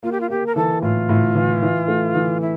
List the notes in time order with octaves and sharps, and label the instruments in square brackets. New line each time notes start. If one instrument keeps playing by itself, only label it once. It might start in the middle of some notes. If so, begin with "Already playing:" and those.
[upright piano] A#3 [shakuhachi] F4
[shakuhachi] G4
F4
[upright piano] A#3 [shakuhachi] G4
[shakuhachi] A#4
[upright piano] E3 [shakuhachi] A4
[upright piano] A2 [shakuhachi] F4
[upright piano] A2
E3
E3
A3
E3
[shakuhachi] E4